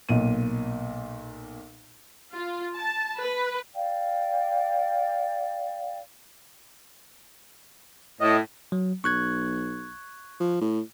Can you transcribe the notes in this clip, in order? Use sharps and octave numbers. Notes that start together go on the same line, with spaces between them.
B1 A#2 D#7
F4
A5
B4
D5 F5 G5
A2 D#5
F#3
B1 C#6 F#6 G#6
F3
A2